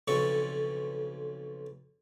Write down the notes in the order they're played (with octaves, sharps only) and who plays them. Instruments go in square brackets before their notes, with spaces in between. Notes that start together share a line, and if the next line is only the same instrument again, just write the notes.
[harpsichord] B1 F2 C#3 A4 C#6